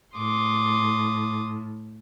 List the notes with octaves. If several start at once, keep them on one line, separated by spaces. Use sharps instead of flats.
A2 C6 D6 D#6